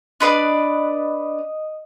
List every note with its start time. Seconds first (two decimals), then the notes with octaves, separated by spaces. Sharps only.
0.20 D4 B4 D5 D#5 D#6